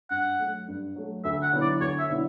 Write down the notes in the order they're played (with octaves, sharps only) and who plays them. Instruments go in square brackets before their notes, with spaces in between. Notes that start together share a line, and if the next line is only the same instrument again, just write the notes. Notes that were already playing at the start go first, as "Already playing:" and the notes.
[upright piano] G2 [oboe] F#5
[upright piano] F#3 A3
G2
F#3 A3
[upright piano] D2 [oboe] E5
[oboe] F#5
[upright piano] D3 F#3 B3 E4
[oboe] D5
[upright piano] D2 [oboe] C#5
[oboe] E5
[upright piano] D3 F#3 B3 E4